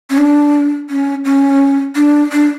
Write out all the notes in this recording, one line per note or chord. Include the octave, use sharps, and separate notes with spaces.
C#4
D4
C#4
C#4
D4
D4